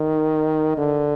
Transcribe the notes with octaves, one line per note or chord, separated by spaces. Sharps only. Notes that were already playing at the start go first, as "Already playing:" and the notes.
Already playing: D#3
D3